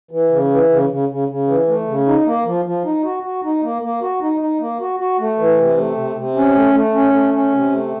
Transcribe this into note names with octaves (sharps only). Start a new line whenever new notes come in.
E3
C#3
E3
C#3
C#3
C#3
C#3
E3
A3
C#3
D#4
A#3
F3
F3
D#4
F#4
F#4
D#4
A#3
A#3
F#4
D#4
D#4
A#3
F#4
F#4
A3
E3
C3
A3
C3
C3
C#4
A3
A3
C#4
A3
C#4
C3
A3